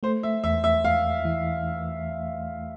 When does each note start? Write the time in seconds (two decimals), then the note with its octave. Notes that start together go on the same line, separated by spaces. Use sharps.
0.03 A3 C5
0.23 E5
0.44 E2 E5
0.64 E5
0.84 E2 F5
1.25 E3